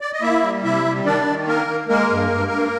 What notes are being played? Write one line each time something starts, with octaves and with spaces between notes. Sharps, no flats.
D5
D#5
A#3 E4 E5
G3
C3 E4 E5
G3
D#3 D4 D5
D#3
A#3 A#4
A#3
G#3 A#3 A#4
G2
G2
G2